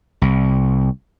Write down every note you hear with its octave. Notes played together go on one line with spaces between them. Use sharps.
C2